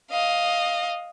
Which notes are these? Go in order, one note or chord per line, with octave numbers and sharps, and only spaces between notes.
D#5 F5